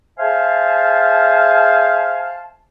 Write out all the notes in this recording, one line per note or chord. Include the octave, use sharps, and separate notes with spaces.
G#4 C5 E5 F5 G#5 A5